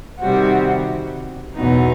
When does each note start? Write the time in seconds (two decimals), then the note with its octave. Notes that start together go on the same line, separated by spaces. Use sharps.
0.20 C3 D#3 G3 C4 F#4
1.56 E2 B2 F#3 B3 D#4